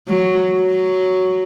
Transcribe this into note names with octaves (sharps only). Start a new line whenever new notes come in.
F#3
F#3